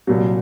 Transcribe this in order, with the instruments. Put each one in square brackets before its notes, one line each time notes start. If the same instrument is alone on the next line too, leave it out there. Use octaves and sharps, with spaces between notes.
[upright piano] C2 A#2 F#3